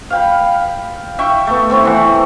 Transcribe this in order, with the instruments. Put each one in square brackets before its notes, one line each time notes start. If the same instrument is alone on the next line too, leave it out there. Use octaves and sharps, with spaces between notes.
[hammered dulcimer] F5 G5 B5
E5 G5 C#6
A3 B3
A3 C4 E4 F#5
E3 F#5